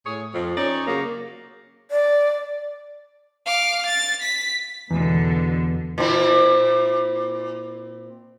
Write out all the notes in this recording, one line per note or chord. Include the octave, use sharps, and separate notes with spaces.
A2 G#4 C#5
F2
C#4 D#4 C#5 D5
C#3 F#3 A#3
D5
F5 D6
A6
B6
E2 B2 D3
A#2 C4 E4